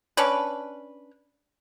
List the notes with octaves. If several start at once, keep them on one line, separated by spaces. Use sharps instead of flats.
C#4 D4 B4